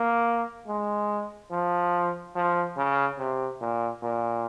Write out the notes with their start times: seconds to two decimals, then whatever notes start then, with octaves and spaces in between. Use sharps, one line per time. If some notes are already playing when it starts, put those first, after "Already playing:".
Already playing: A#3
0.68 G#3
1.51 F3
2.35 F3
2.77 C#3
3.19 C3
3.60 A#2
4.02 A#2